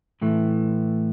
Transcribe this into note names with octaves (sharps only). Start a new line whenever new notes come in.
A2 E3 A3